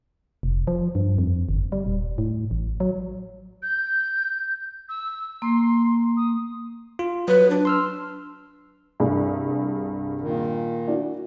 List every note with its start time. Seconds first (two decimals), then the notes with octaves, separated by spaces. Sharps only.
0.43 F1
0.67 F3
0.95 G2
1.18 F2
1.49 G1
1.72 G3
1.87 D#1
2.18 A2
2.51 A1
2.80 F#3
3.62 G6
4.89 E6
5.42 A#3 C6
6.17 D#6
6.99 F4
7.28 F#3 B4
7.50 D4
7.65 C6 E6 F6
9.00 C2 G2 G#4
10.21 A#2 D#3
10.88 D4 E4 F#4